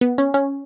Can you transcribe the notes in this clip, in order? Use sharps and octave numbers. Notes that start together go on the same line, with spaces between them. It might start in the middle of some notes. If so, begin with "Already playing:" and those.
B3
C#4
C#4